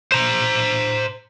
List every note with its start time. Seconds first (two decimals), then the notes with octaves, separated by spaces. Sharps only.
0.12 C5 A#5